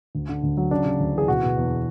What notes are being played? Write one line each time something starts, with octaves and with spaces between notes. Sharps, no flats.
D2
D3
D2
F#3
C#3 D4
C#3
D2
E3 G#4
B2 F#4
B2
E2